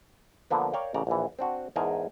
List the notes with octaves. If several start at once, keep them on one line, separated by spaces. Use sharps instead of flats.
D3 F3 A#3 B3
A#4 C#5 D5 F5 G5
A1 C#3 D5 A#5
A#1 E3
C4 D4 F#4
E2 G#2 D#4 G#4 A#4 A5